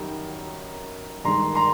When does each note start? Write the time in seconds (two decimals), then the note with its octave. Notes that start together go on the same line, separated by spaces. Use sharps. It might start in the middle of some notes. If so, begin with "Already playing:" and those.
Already playing: F#2 D#3 G3
1.24 G2 D#3 G#3 A#5 C6
1.55 A#5 C6